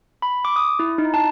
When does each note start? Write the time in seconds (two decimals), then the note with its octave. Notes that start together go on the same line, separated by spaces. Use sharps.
0.22 B5
0.45 D6
0.56 D#6
0.79 E4
0.98 D#4
1.14 A5